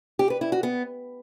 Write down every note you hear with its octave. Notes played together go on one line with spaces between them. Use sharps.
G4
B4
E4
F#4
B3